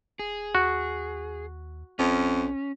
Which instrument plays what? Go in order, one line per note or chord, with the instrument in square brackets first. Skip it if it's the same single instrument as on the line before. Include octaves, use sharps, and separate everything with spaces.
[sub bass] D#1 [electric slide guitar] G#4
[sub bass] D#2 [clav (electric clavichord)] F#4
[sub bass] A#1 [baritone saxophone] F2 [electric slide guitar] C#4